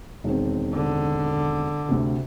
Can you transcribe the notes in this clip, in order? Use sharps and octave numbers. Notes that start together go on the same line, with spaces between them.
E1 D#3 C4
D3
D2 C3